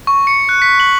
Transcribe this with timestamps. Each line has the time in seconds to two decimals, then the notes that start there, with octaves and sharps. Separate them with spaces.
0.07 C#6
0.27 C#7
0.49 F#6
0.62 B6
0.80 F#7